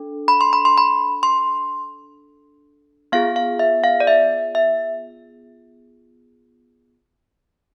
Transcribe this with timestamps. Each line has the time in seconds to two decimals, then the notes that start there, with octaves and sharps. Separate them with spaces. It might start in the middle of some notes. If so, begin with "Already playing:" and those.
Already playing: D4 A4
0.28 B5
0.41 C6
0.53 B5
0.65 C6
0.78 B5
1.23 C6
3.12 B3 F4 G#4 F5
3.36 F5
3.59 E5
3.84 F5
4.00 D5
4.07 E5
4.55 E5